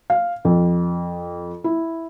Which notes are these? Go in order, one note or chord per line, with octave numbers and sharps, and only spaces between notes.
F5
F2
E4